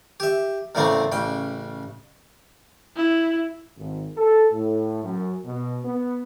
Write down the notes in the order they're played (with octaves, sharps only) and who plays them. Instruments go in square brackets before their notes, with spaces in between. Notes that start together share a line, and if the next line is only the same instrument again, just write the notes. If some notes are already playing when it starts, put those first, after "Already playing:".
[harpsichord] G4 E5
E2 A2 C#3 A3 A#3 C4
A1 C#3 G5
[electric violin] E4
[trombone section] G#1
A4
A2
F#2
B2
B3